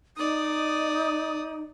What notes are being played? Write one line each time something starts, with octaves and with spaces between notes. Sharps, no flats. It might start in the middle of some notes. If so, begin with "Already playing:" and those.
D#4 D5 D#6